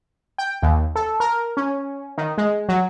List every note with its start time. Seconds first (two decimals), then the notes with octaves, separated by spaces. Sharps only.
0.38 G5
0.62 D#2
0.96 A4
1.20 A#4
1.57 C#4
2.18 D#3
2.38 G#3
2.69 F#3